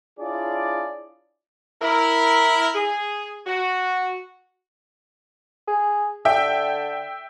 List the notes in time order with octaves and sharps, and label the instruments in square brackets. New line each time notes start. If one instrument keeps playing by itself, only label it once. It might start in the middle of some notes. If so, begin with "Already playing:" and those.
[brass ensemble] D4 E4 F4 G#4 C#5 D5
[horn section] E4 A#4
G#4
F#4
[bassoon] G#4
[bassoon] D3 [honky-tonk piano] E5 G5